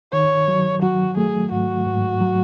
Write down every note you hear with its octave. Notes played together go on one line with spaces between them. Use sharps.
D#3 C#5
F#3
F#3 F#4
A3 G#4
G#2 F#4
G#2
F#3